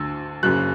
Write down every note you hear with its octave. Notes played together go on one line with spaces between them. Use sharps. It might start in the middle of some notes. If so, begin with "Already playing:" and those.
Already playing: D2 D3 E6
F#1 F#2 C#3 F#6